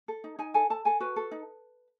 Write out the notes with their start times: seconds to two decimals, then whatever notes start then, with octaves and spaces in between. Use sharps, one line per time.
0.08 A4
0.24 D#4
0.39 D#4 G#5
0.54 A4 G#5
0.70 A4 A5
0.85 A4 G#5
1.00 F#4 B4
1.16 A4
1.31 D#4